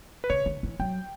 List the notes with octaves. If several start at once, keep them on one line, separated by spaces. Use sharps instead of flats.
B4
C#3 C#5
D3
E3
F#3 G5